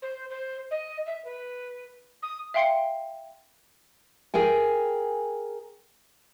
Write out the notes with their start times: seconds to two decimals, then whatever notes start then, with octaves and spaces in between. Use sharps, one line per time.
0.02 C5
0.30 C5
0.71 D#5
1.06 E5
1.25 B4
2.22 D#6
2.54 E5 F5 G5 C6 C7 C#7
4.34 G#4 A#4 G5 G#5